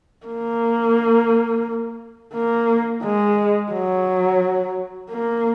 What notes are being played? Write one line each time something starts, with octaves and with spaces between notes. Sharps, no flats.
A#3
A#3
G#3
F#3
A#3